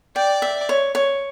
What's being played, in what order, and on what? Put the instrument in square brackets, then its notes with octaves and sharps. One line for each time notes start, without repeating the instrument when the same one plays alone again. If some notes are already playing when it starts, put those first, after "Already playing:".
[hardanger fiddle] D5 [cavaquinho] G5
[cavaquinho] E5
C#5
C#5